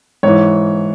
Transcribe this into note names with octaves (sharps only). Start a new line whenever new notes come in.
G#2 E3 C#5